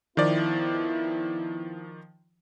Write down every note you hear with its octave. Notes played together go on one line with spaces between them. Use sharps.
D#3 F3 B3 E4 D5